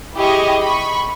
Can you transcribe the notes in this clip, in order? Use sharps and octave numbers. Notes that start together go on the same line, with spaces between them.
E4 G4 G#4 D#5 C#6
B5 C#6